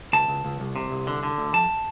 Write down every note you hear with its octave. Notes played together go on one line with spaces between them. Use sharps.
C#2 A5
C#2
C#2
C2
C3
C2
D3
D3
D2
F2 A5